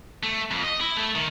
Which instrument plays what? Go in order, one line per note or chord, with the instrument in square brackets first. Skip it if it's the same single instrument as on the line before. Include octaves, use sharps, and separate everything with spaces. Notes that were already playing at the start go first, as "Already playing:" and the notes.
[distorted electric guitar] A3
F2
D#5
E4
A3
D#3